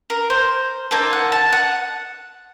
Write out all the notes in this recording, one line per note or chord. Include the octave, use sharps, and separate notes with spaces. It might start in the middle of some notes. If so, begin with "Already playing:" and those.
A#4
C5
A#3 D#4 A4 C5
F#5
A5
F#5